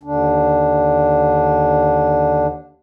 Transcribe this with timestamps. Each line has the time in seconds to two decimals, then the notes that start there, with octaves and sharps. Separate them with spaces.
0.03 D#2 D3 D4